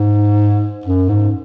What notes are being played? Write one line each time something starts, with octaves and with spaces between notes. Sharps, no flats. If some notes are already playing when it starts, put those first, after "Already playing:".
Already playing: G#2
F#2
G#2